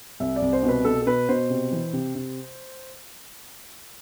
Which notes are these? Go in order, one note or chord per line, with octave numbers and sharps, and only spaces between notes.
C2 E5
D5
C2
C5
B2
B4
B2 A4
A4
B2 B4
B2 C5
C3
E3
C3
C3